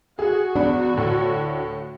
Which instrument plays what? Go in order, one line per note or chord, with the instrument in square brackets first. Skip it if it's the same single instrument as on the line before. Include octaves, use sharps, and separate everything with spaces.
[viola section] F#4 [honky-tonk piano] G#4
[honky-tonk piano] E2 B5 [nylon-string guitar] D4
[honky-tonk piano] D2 A2